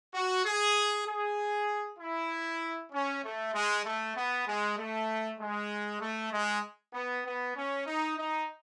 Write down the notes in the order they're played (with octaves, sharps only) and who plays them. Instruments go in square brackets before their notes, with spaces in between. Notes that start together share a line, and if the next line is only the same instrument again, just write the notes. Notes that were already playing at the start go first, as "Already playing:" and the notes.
[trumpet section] F#4
G#4
G#4
E4
C#4
A3
G#3
A3
B3
G#3
A3
G#3
A3
G#3
B3
B3
C#4
D#4
D#4